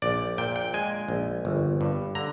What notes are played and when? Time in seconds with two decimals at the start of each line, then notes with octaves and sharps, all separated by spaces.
0.02 A#1 D5
0.38 A#2 G5
0.56 G5
0.74 G#3 G#5
1.08 A#1
1.45 G1
1.81 G2
2.15 D3 A#5